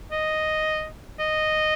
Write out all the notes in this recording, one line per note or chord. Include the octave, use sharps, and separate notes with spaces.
D#5
D#5